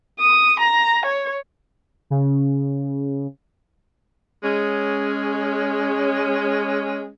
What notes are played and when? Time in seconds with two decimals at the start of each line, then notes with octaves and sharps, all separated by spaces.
0.20 D#6
0.60 A#5
1.06 C#5
2.10 C#3
4.43 G#3 C#4